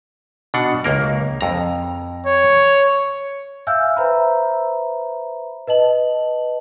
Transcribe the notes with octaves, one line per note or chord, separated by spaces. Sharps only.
B2 D4 F#5
C#2 A#3 A#4
F2 A#5
C#5
E5 F5 G#5 E6 F6 G6
B4 C5 E5 A#5 B5
B4 D#5 A5 F#7